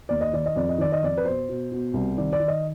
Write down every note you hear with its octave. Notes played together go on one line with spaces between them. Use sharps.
D#2 D5
D#5
D#3 D5
D#5
F2 D5
D#5
D#3 D5
D#5
F2 D5
B4
B2 C5
B2
B2
C2
D#3 D5
D5
D#3
D#5